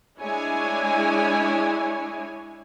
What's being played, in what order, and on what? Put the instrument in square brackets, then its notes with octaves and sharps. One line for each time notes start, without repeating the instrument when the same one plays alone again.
[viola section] G#3 D4 E4 C#5 G#5